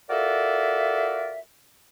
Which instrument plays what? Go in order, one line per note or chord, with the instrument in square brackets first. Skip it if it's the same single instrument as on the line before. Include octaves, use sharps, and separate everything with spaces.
[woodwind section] F4 F#4 A4 A#4 D5 E5